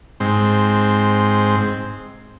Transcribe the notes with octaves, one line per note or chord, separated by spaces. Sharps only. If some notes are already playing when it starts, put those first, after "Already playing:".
G#2 C4